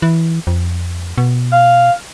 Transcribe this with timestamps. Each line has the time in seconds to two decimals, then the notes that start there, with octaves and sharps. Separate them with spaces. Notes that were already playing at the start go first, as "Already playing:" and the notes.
0.02 E3
0.47 F2
1.18 B2
1.52 F5